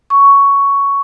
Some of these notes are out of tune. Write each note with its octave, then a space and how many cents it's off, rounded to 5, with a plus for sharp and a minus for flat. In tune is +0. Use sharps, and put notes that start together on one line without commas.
C#6 +10